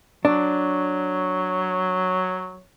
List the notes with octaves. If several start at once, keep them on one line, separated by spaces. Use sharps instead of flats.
F#3 D4 C#5